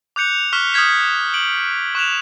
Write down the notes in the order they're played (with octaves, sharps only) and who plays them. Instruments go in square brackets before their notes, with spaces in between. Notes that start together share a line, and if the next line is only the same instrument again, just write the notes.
[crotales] D6 F#6 G6 C#7 F7
C#6 F6 F#6 B6 G7
D#6 F6 G6 G#6 B6
D7 F#7
C#6 F#6 E7 F7